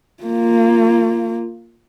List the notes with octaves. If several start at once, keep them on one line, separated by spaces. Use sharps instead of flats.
A#3 F4